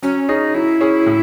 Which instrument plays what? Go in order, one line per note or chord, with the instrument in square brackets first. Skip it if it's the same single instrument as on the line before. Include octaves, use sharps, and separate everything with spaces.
[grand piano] F#3 [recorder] C#4
[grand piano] C#4 G#4 [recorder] D#4
[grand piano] F#3 [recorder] E4
[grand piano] C#4 G#4
A2